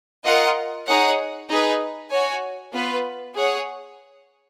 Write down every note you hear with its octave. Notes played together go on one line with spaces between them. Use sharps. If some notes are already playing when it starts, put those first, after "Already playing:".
F4 A#4 D#5 F#5
D#4 G#4 C#5 F#5
D#4 G#4 B4
F#4 C#5 G#5
B3 F4 B4
G#4 C#5 F#5